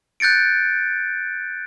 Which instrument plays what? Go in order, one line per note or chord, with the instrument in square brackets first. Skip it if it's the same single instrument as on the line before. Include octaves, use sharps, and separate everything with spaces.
[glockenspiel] F#6 G6 A6 C#7 D7